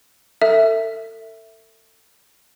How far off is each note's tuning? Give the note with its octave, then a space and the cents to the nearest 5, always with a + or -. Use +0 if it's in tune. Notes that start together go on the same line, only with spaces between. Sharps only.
A4 +35 E5 +0